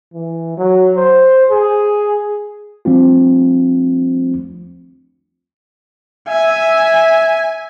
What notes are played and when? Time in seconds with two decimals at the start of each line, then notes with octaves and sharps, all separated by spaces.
0.14 E3
0.58 F#3
0.97 C5
1.51 G#4
2.85 F3 G3 A3 C4 D4 F4
6.29 E5 G#5